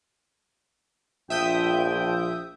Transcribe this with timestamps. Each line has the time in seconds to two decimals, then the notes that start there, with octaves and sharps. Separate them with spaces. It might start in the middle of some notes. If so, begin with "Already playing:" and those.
1.30 A#1 F3 E5 G5 D#6 G6